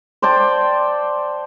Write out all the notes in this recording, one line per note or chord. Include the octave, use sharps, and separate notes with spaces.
C5 D5 G5 A5